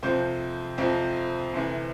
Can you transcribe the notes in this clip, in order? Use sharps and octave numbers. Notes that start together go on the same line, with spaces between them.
F2 C3 F3 C5
F2 C3 F3
D2 C3 E3